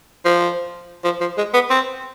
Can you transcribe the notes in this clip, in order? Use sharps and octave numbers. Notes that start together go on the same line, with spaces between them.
F3
F3
F3
G#3
B3
C4